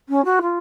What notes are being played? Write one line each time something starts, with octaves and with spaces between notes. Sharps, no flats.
C#4
F#4
F4